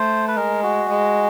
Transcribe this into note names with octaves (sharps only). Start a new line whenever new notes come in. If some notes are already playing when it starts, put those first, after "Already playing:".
Already playing: A3 C5
B4
G#3 A#4
F#4
G#3